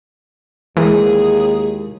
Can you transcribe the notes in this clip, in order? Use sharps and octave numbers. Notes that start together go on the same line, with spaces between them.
D#2 E3 G#3 E4 G#4 A#4